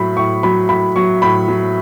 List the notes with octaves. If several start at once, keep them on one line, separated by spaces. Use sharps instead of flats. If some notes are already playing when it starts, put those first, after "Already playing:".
Already playing: A2 F#3 B5
A2 C#6
F#3 B5
A2 B5
F#3 C#6
A2 B5
F#3